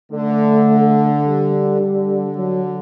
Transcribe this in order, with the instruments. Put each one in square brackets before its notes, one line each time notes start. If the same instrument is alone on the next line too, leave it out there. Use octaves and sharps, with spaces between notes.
[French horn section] D3 [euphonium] A3
[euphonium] G3
[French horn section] D3
[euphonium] F#3